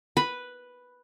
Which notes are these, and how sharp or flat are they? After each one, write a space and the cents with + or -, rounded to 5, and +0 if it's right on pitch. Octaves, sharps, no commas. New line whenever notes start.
B4 +0 B5 +0